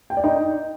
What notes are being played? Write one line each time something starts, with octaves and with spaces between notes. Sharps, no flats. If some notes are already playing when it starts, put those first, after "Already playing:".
G5
D5
D#4